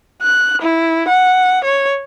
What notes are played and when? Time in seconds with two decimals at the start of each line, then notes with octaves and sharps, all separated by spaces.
0.22 F#6
0.62 E4
1.08 F#5
1.64 C#5